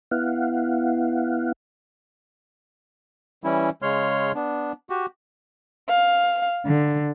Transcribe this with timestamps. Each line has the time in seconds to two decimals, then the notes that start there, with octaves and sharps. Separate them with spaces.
0.11 B3 E4 F5 F#5
3.44 E3 G3 C#4 E4
3.82 C#3 G#3 C#5 C6 F6
4.35 B3 D4
4.90 F#4 G4
5.89 F5
6.65 D3